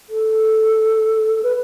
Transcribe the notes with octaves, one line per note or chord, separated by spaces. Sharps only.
A4
B4